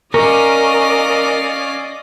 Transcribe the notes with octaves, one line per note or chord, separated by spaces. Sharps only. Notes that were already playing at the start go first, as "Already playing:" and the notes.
C#4 A#4 D5 D#5 F5 D6